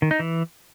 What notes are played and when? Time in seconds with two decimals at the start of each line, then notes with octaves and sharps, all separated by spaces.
0.02 D#3
0.11 D#4
0.20 E3